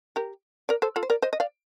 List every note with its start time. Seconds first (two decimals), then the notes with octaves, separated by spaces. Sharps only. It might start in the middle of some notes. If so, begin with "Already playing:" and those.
0.16 G4 A#4
0.69 A#4 D5
0.82 A4 C5
0.96 F4 A4
1.03 C5
1.10 A#4 D5
1.22 C5 D#5
1.33 D#5
1.40 D5 F5